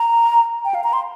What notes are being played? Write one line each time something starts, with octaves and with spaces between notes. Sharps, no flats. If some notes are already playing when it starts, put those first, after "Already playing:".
Already playing: A#5
G5
F5
A#5
C6